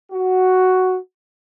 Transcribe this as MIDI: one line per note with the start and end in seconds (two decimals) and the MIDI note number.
0.12 0.97 66